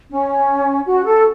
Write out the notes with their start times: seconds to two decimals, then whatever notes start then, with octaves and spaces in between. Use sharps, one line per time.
0.10 C#4
0.86 F#4
1.05 A4